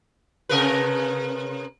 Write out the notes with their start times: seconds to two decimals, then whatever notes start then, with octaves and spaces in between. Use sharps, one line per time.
0.49 C3 A#4 B4